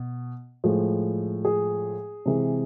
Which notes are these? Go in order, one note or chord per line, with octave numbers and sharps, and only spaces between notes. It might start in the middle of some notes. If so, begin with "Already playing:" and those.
Already playing: B2
A2 F3 G#3
G#4
C3 E3 G#3